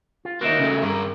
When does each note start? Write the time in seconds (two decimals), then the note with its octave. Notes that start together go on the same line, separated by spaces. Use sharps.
0.25 F4
0.41 A#3 D#4 F#4 A#4 E5
0.59 C#3 A3
0.82 G2 G#3 A#4